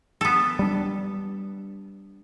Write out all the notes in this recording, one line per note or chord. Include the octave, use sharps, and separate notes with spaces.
B3 A4
G3 D4